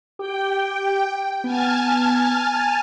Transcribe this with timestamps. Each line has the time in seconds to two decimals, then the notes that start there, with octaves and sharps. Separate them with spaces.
0.19 G4 G5
1.44 B3 G#5 A5 F6